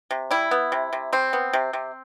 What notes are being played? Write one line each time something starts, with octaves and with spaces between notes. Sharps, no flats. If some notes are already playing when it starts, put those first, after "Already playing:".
C3
G3 E4
B3
C3
C3
G3 C4
B3
C3
C3